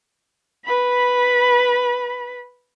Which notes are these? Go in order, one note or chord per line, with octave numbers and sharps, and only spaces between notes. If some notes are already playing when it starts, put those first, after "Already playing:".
B4 B5